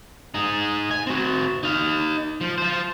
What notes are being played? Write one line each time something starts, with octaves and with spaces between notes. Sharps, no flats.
D#4 G#4
G#5
C4 F#4
D#4 F5
F3
F4 C5